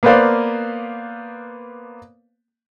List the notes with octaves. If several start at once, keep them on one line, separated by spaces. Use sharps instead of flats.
A#3 B3 B4 C5 D5 F5